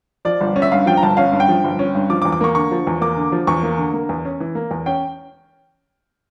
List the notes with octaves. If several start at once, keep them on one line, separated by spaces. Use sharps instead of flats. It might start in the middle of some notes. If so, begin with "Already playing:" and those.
F3 D5
G1
C#4
E5
G2 F5
F3 G5
A#5
G1 A5
C#4 F5
G2
G5
F3
G1
C#4
G2
F3 D6
D6
E2
D6
A#3 C#6
D3 C#6
F3
E2
A#3 D6
D3
F3
E2 C#6
A#3
D3
A#3
E2
C#4
E3
A#3
E2
C#4 G5